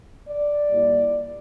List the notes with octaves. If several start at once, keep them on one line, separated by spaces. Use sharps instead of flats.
D5
A#2 G3 A#3 E4